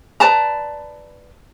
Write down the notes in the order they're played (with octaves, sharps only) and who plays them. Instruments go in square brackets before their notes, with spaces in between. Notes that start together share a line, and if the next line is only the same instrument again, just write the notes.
[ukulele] B4 D5 A5 A#5